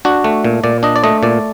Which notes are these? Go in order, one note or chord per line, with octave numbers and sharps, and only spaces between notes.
D4 F#4
A3
A#2
A#2 D5
D4 D#5
D5
A3 D#5
A#2 D5